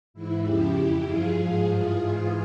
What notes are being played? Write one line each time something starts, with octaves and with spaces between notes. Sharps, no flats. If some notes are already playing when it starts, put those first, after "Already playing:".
G#2 E3 E4
E2 C#3 F3 E4 G4
F2 E3
G2 F3 F4 G#4
G#2 F3
G2 E3 F4 G#4
G#2 E3